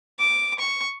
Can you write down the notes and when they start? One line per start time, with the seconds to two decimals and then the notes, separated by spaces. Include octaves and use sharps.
0.19 D6
0.59 C#6